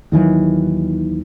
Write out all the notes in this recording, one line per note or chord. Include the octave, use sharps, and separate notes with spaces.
D#2 D#3 E3 F#3